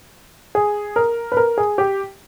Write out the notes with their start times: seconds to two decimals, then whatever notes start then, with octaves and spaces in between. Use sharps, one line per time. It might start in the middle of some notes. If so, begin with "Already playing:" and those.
0.55 G#4
0.96 A#4
1.32 B4
1.37 A#4
1.58 G#4
1.78 G4